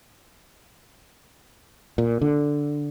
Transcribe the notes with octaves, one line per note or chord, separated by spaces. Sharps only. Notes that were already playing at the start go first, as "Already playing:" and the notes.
A#2
D3